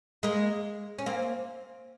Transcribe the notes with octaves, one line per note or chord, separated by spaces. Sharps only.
G#3 A#3
C#4
A#3 C4